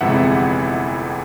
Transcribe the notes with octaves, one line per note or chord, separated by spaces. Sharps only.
G1 F2 C3 E3 G#3 E5 F#5